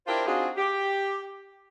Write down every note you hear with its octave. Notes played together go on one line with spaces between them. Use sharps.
D4 E4 F4 G4 A#4 C5
C4 D4 D#4 F4 F#4 G#4
G4